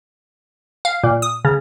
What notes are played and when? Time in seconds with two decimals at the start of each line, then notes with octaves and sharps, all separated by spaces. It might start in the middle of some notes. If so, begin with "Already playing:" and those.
0.85 F5
1.04 A#2
1.22 D#6
1.45 C#3